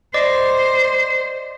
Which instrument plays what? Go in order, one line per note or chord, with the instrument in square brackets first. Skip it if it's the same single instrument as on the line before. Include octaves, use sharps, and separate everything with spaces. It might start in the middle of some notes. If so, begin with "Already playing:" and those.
[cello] C5 [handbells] D5 D#5 D6